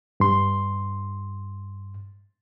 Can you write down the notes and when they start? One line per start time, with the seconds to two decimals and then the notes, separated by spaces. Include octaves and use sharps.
0.20 G2 C6